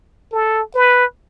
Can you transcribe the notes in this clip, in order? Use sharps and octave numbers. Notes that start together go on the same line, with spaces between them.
A4
B4